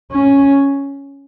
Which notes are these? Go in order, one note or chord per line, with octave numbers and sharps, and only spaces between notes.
C#4